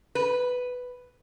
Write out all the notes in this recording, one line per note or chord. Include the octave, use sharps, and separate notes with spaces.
B4